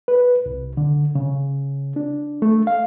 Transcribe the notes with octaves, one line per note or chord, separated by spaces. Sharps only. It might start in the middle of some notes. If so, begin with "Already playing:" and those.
B4
C2
D3
C#3
D4
A3
F5